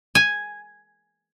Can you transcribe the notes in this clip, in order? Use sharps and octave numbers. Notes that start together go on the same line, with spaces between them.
G#5